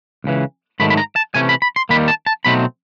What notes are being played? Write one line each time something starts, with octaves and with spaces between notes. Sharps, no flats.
C#2 C#3 E3
G#2 D#3 F#3 A3 B5
B5
A#5
A5
C3 E3 A3 C#4 G#5
B5
B5
C6
D#2 D#3 G3 A#3 B5
A5
A5
B2 F#3 A3 C4 D#4 B5